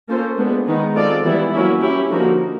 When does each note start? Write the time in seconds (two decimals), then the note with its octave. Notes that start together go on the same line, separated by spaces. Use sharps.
0.08 A#3 C#4 F4 A4 C5
0.37 G#3 B3 D4
0.66 D#3 G#3 B3 D#4
0.95 G#3 C4 F4 A4 D5
1.24 E3 G3 B3 E4
1.52 F#3 A#3 C#4 E4
1.81 C#4 E4 G4
2.10 D3 F3 A#3 D#4 F#4